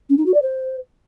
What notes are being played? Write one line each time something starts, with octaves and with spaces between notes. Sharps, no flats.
C#4
D#4
F#4
D5
C5